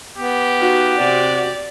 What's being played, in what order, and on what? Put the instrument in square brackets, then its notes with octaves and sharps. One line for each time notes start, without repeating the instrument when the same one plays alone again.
[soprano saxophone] B3 [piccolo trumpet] G4
[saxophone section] D#4 F4 F#4
[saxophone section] C3 F#4 [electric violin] D5